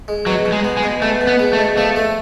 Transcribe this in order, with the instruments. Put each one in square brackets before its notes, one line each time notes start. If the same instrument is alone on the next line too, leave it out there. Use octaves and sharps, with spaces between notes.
[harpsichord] G#3
[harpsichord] B2 [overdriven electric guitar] F#3
[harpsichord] B2
[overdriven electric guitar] G#3
[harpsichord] B3
[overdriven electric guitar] G#3
[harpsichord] B2
[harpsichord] B2 [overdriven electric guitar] A3
[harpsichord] B2
[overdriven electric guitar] B3
[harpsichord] G#3
[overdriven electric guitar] A3
[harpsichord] B2
[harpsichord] F3 [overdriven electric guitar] A3
[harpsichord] A3